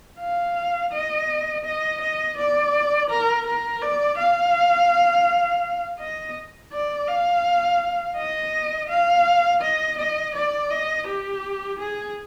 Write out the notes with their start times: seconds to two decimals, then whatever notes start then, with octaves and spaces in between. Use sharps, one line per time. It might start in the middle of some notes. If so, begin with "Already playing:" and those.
0.19 F5
0.92 D#5
1.65 D#5
2.01 D#5
2.37 D5
3.10 A#4
3.46 A#4
3.82 D5
4.18 F5
5.99 D#5
6.72 D5
7.07 F5
8.17 D#5
8.89 F5
9.62 D#5
9.98 D#5
10.35 D5
10.70 D#5
11.07 G4
11.79 G#4